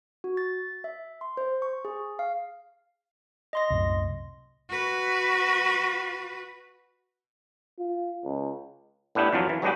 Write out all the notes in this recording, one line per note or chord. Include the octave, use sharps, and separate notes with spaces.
F#4
A6
E5
C6
C5
C#6
G#4
F5
D#5 C6 A#6
C2 F#2 A2
F#4 B4
F4
C#2
A2 B3 D4 E4 G4
F2 E3 F#3 F4 A5
E3
F#3 G#3 B3 D4 F#4 G4